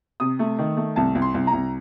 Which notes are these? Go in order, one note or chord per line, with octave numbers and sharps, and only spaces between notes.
C3 D#6
A3
D#3
A3
C2 A5
C2
C6
C2
A#5
C2